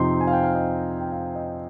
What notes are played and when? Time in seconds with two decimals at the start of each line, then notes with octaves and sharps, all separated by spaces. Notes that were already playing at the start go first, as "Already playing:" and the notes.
Already playing: F2 C3 F3 C4 D#4 C6
0.21 G#5
0.27 F5
0.32 G5
0.44 F5
0.55 D#5
1.00 G5
1.12 F5
1.35 D#5